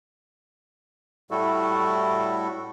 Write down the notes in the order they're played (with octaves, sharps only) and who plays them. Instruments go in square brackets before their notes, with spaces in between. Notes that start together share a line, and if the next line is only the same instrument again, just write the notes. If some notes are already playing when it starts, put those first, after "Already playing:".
[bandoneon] A2 G3 A3 E4 F#4 A4